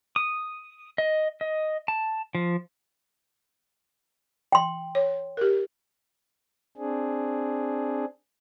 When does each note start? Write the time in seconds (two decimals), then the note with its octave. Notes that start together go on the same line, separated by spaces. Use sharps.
0.16 D#6
0.98 D#5
1.41 D#5
1.88 A5
2.35 F3
4.52 G5 C6
4.95 C#5
5.37 G4 A#4
6.77 C4 D4 G#4